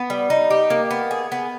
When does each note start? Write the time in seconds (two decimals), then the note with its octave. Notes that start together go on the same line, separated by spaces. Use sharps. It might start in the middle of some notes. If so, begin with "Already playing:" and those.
Already playing: B3
0.10 G3
0.30 D#4
0.50 G4
0.70 A#3
0.91 B3
1.11 G#4
1.32 B3